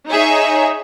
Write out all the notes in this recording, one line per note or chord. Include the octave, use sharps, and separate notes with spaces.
D#4 G#4 C#5 E5